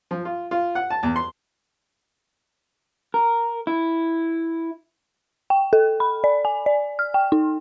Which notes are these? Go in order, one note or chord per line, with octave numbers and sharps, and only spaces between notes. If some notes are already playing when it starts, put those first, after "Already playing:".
F3
F4
F4
F#5
A5
E2
C6
A#4
E4
G5
A4
B5
D5
G#5
D5
F6
G5
D#4